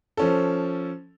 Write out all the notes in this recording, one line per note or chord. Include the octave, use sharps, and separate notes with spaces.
F3 C#4 A4